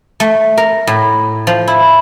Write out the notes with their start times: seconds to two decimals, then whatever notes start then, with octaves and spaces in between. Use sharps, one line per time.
0.20 A3
0.57 A#4
0.87 A2
1.47 F3
1.68 E4